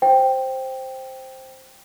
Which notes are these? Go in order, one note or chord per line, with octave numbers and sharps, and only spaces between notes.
C5 G5